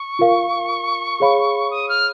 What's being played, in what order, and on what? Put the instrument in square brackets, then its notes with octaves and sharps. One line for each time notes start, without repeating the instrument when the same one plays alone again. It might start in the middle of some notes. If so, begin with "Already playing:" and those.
Already playing: [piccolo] C#6
[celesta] F4 A#4 F5
G#4 C#5 F5 B5
[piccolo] D#6
F6